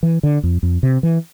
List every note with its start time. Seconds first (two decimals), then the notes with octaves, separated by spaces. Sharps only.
0.03 E3
0.23 D3
0.43 F2
0.63 F2
0.83 C3
1.03 E3